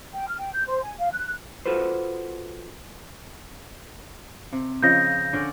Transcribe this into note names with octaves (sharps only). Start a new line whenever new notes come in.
G5
F6
G5
G6
C5
G#5
F5
F#6
F4 F#4 A4 B4 C5
C3
C#3 F3 D#5 G6 A#6
D3 C#4 D5